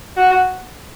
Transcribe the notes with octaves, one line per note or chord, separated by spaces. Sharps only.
F#4